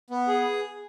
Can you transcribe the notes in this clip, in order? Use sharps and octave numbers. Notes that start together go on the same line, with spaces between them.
B3
G#4